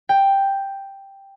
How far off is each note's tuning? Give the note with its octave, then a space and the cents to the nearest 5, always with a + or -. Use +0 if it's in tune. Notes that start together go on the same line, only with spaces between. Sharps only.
G5 +5